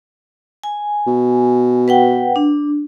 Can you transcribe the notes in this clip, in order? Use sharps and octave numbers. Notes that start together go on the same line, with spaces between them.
G#5
B2
B4 F#5 G5
D4